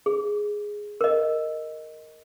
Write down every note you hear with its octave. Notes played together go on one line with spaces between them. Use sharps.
G#4
A#4 D#5